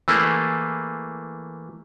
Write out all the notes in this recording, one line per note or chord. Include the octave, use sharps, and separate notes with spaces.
E3 A3 A#3 G#4